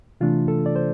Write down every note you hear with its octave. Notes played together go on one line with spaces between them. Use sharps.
C3 E3 A3 D4 F4
A4
D5
C5